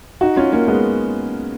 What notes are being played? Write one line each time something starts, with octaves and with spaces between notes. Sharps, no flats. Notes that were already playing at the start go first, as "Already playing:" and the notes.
D#4 F#4
C#4 F4
A#3 C#4
G#3 B3